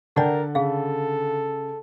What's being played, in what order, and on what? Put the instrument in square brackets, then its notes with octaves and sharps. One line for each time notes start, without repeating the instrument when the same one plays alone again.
[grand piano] D3 [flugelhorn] A#4 [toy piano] D5 F#5 [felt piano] G5 A5
[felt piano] C#3 [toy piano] G#4 F5 [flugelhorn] A4